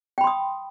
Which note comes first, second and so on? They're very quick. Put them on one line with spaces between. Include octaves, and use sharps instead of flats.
G5 B5 C6 D#6